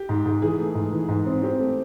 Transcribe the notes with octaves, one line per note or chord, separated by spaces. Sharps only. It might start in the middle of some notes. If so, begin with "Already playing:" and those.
Already playing: G4
G#2
G#2
E3 G#4
A3
G#2
E3
G#2
C4
C4 G4
A3